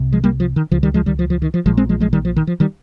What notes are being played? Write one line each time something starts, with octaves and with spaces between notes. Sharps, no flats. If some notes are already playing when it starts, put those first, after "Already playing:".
Already playing: C2 C3
F3 G#3
G3 A#3
F3
D#3
C#2 C#3 F3
D#3 G3
F3 G#3
D#3 G3
F3
F3
D#3
F3
A#1 A#2 F3 G#3
G#3 C4
F3 G#3
F3 G#3
D#3 G3
F3
D#3
F3
D#3 G3